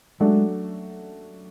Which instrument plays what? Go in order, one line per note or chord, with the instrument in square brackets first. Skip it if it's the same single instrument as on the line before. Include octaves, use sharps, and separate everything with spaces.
[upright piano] F#3 A3 D4 F#4 A4 [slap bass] G#3